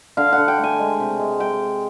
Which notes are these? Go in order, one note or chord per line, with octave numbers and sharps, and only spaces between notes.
D3 F5
F#5
D3
G5
A3
G#5
G#3
C3
G#3
G#3 G5